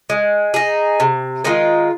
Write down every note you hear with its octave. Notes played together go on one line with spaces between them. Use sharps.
G#3
D#4 G#4
C3
D#3 G#3 F4